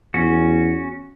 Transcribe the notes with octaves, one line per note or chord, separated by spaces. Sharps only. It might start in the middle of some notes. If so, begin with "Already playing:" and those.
E2 C#4 F#4